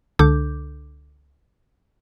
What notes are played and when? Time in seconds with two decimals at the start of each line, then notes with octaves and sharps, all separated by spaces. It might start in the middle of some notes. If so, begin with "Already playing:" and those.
0.19 C#2 D3 D4 A4 D6 G6